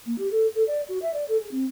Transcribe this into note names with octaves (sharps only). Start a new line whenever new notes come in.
A#3
G4
A4
A4
D5
F#4
E5
D5
A4
G#4
C4